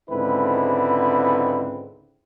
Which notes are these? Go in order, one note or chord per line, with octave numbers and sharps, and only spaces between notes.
C#2 G#2 D3 C4 E4 B4